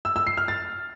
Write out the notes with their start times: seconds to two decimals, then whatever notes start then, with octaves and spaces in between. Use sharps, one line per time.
0.05 E6
0.16 E6
0.27 C7
0.37 F6
0.48 A6